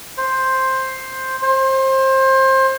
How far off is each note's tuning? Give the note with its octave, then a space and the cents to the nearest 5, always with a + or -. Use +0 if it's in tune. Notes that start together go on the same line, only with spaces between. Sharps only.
C5 +5
C5 +25